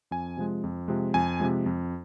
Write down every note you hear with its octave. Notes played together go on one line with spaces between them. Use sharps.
F2 G#5
C3 F3 G#3
F2
C3 F3 G#3
F2 G#5
C3 F3 G#3
F2